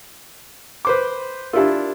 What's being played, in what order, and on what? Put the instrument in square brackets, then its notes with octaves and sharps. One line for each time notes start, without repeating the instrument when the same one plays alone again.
[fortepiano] B4 C5 D6
[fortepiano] D4 E4 F4 [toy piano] G4 A#4